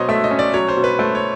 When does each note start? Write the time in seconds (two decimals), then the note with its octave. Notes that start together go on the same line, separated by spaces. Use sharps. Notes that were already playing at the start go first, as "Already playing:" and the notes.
Already playing: B2 F#3 C5 C#5 D#5
0.09 A3 E5
0.24 D#5
0.31 C#4
0.39 D5
0.54 F#3 C#5
0.68 C5
0.77 B2
0.84 B4
0.99 A3 C5
1.15 C#5